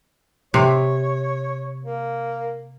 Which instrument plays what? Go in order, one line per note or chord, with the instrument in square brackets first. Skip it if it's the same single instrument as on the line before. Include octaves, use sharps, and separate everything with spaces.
[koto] C3 [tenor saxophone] C#5
[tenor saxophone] A#3